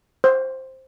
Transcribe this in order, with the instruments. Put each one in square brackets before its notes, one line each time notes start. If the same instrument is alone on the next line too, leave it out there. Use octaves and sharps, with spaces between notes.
[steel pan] C5